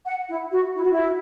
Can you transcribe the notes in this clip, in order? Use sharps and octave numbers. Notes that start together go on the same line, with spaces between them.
F#5
E4
F#4
E4
F#4
E4